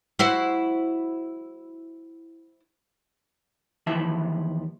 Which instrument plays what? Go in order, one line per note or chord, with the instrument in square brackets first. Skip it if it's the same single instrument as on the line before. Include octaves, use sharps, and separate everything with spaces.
[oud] E4 F#4 C5
[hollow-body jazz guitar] D#2 E3 F3 E4 E5 A5